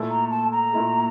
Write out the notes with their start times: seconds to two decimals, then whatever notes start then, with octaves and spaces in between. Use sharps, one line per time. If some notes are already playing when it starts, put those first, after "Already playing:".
Already playing: A#2 A3 E4 A4
0.10 A#5
0.31 A5
0.52 A#5
0.72 A#2 A3 E4 A4